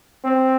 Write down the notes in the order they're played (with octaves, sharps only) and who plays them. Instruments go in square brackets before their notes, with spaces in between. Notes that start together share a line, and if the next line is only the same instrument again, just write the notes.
[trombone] C4